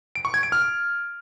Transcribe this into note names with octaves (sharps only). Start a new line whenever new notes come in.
D7
C#6
G#6
D7
F6